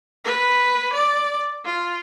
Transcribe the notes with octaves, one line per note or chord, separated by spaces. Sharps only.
B4
D5
F4